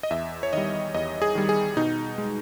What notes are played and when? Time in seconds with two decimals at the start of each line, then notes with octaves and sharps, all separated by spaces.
0.03 D#5
0.11 E2 E5
0.43 C#5
0.53 D#3 G3 D#5
0.94 E2 D#5
1.22 G#4
1.35 D#3 G3
1.49 G#4
1.77 B2 D#4
2.18 G#3